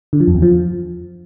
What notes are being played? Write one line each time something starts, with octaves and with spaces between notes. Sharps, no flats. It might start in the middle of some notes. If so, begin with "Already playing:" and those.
D3
F3
F2
E2
F3